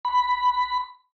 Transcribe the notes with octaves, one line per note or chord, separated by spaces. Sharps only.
B5